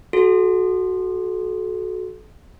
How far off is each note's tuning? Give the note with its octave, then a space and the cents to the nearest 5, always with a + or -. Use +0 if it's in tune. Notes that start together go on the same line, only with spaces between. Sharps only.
F#4 +0 A4 -35